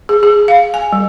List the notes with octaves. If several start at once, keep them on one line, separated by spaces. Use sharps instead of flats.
G#4
G#4
F5
G#5
G3